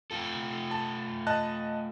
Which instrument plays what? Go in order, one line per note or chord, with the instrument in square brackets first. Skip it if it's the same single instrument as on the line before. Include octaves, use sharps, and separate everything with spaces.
[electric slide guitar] A3 F4 A4
[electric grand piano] A5
D#5 A5 F#6